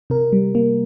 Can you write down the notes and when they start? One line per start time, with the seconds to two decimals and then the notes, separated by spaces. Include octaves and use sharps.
0.10 C3 A#4
0.32 G3
0.55 A#3